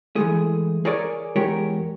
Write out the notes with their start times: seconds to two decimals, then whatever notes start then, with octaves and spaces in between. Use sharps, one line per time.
0.16 E3 G#3 A3 G#4
0.85 G#4 A#4 C#5 D5 G5 G#5
1.36 E2 G#3 G4 A#4 C#5